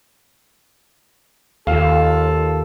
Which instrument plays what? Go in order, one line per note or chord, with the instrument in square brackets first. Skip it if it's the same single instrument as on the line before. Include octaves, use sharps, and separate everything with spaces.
[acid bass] D#2 [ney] F4 [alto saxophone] A4 [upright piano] F5